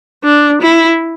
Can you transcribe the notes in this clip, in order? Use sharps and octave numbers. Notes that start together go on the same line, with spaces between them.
D4
E4